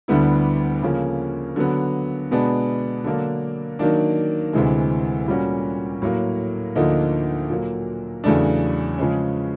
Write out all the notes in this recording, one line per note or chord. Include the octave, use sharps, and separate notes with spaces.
D2 D3 G3 B3 E4
C#3 F3 A#3 C#4
D3 F#3 B3
B2 G#3 B3 D4
D3 F#3 A#3 D4
D#3 F#3 A#3 D4
D2 C3 E3 G#3
A#2 G3 A#3 C#4 F#4
A2 F#3 A#3
D2 D3 F3 A#3 D#4
A#2 F#3 A#3
E2 C#3 F#3 A3 D4
C#3 F3 G#3 C#4